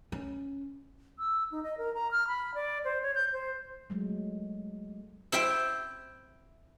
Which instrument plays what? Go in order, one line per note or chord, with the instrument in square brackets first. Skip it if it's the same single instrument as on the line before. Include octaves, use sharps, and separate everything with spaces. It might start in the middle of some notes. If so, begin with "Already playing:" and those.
[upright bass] C#4
[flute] E6
D#4
D#5
A#4
A#5
F6
B5
D5
C5
C#5
G6
C5
[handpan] F#3 G#3 A3
[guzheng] E4 C5 E5 G5